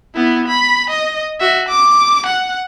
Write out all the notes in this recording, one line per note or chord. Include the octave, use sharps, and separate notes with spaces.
B3 E4
B5
D#5
F#4 E5
D6
F#5